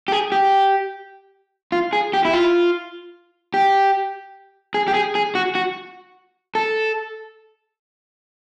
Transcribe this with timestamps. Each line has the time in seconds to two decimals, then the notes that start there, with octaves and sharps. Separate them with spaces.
0.08 G4
0.12 G#4
0.32 G4
1.72 F4
1.93 G#4
2.13 G4
2.25 E4
2.33 F4
3.54 G4
4.74 G#4
4.88 G4
4.94 G#4
5.15 G#4
5.35 F#4
5.55 F#4
6.55 A4